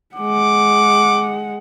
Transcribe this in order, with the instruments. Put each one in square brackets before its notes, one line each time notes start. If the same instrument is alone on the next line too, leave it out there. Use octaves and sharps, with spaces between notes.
[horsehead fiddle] G#3 F#5 [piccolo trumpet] D6